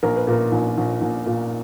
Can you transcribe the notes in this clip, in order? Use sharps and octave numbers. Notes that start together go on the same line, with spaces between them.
A#1 A#4
B4
A#2 A#4
A#1
A#1
A#1
A#2